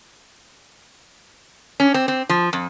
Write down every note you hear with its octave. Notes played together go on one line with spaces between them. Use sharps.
C#4
C4
C4
F3
F2